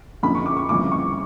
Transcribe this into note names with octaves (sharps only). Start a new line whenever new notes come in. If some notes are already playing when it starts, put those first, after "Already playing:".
F#1 F2 D3 B5
C#6
D6
C#6
G1 F2 C#3 E3 D6
C#6